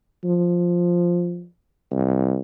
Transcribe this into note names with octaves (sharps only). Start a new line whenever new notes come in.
F3
C2